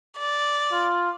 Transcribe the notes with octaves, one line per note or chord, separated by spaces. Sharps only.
D5
F4